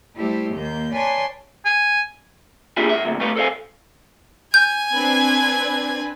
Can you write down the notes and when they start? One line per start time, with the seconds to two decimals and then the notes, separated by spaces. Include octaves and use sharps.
0.17 G3 A3 E4 G4 C5
0.54 D#2 D#3 A#3 G6
0.93 B4 C#5 D5 G#5 A5 C6
1.65 G#5
2.77 A#3 D4 E4 F4 G4 G#4
2.89 G#2 E5
3.05 D2 A#2
3.20 G2 G3 A3 G4 B4 F5
3.37 A4 C5 C#5 F5 G#5
4.54 G#5 G6 G#6
4.95 C4 D4 B4